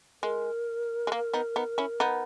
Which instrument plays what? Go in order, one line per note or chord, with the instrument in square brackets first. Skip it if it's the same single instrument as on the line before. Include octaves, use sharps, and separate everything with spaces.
[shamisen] G#3 [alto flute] A#4
[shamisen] G#3
A#3
B3 D#4
B3 D#4
C#4 E4
B3 D#4